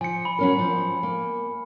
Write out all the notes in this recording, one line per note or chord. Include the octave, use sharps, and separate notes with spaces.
F3 G#5 C#7
B5
F#3 C#4 A#4
F3
A#3